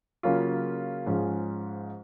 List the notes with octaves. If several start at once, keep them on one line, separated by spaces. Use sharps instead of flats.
C#3 F#3 A#3 C#4 F4
G#2 F3 G#3 C#4 F4